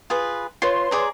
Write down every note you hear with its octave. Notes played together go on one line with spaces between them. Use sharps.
F4 G#4 B4
F4 B4 C#5 C6
G#4 D5 A#5